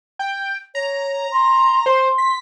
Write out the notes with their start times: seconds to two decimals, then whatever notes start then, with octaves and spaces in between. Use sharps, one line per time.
0.19 G5
0.75 C#5 A#5
1.32 C6
1.86 C5 C6
2.18 B6